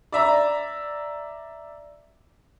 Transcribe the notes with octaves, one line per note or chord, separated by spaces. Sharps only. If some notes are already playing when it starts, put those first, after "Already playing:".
D5 E5 A#5